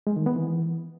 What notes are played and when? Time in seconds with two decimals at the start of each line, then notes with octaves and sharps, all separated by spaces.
0.07 G#3
0.16 D#3
0.26 B3
0.36 E3